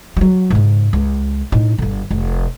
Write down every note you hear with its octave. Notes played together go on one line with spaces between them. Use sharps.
F#3 G3
G#2 C#3
C#2
A2 D#4
G1 D3
F1